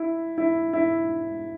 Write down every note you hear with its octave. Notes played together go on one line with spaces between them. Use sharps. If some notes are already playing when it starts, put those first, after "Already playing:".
Already playing: E4
E4
E4